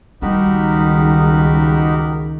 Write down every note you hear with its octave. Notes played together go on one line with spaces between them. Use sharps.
C#2 D#3 G3 D#4 F#4 G4 A#4 B5